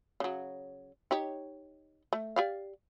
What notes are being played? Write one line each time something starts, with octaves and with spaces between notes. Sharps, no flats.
C#3 F#3
D#4 G4 C#5
A3
G4 D5 F5